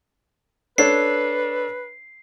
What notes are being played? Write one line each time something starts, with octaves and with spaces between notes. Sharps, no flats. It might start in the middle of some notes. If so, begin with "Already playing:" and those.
D4 A4 B4 C#5 C7